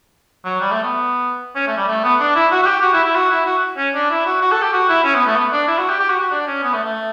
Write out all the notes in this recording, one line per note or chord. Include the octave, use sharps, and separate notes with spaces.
F#3
G3
A3
B3
C#4
A3
G3
A3
B3
D4
E4
F#4
F#4
G4
F#4
E4
E4
F#4
E4
F#4
C#4
D4
E4
F#4
F#4
A4
G4
F#4
E4
C#4
B3
A3
B3
D4
E4
F#4
G4
G4
F#4
F#4
D4
C#4
B3
A3
A3